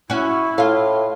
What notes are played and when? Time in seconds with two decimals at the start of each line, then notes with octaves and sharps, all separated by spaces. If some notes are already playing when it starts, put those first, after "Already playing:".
0.10 C#4 E4 F#4
0.58 A2 F4 F5